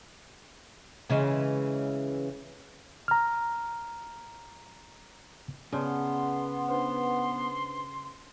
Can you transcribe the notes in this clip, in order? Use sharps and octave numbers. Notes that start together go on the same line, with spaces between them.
C#3 E3 G#3
A#5 F6
C#3 B3 G#4 D5 A5 C6
D4 B4 C5 C6